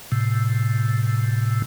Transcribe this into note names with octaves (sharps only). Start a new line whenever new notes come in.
A2 C3